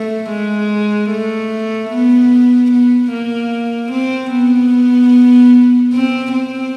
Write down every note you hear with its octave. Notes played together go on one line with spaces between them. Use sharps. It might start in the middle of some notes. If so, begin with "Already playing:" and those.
Already playing: A3
G#3
A3
B3
B3
A#3
C4
B3
C4
C4